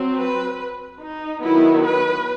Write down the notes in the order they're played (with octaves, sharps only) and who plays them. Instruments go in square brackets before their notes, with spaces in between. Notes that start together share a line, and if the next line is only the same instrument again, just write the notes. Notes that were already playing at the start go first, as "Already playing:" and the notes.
Already playing: [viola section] F#3 C4
B4
D#4
D#3 F#3 B3 E4
B4